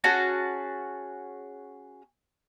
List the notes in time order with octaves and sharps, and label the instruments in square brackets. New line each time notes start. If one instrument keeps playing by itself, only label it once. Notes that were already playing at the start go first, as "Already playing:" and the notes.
[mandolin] C#4 F#4 G#4 A5